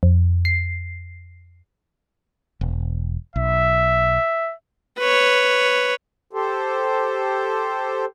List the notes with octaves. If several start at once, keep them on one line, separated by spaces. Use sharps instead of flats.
F2
C7
E1
B1 E5
B4 C#5
G4 A4 C5